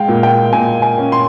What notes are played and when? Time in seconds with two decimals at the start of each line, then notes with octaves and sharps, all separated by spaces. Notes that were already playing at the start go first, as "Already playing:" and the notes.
Already playing: G#3 F5 G5
0.08 A#2
0.23 G5
0.53 A#2 G#5
0.82 G#5
0.98 C#4
1.12 C6